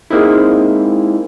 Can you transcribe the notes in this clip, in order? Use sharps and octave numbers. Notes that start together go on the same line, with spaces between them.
G#3 A#3 C4 D#4 E4